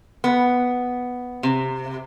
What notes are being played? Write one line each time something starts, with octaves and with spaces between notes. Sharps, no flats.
B3
C3